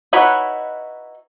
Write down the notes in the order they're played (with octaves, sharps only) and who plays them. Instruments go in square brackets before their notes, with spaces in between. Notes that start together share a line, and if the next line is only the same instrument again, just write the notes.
[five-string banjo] D#4 E4 F#4 B4 C#5